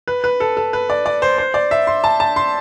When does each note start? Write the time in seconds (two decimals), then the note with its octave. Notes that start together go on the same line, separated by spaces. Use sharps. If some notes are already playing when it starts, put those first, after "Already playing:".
0.08 B4
0.24 B4
0.40 A4
0.57 A4
0.73 B4
0.90 D5
1.06 D5
1.22 C5
1.38 C5
1.54 D5
1.71 E5
1.87 C6
2.04 A5
2.20 A5
2.36 C6